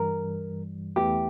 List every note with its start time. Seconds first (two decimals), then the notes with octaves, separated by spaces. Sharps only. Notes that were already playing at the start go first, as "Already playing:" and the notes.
Already playing: G2 E3 G3 A#4
0.96 E2 E3 A3 E4 G4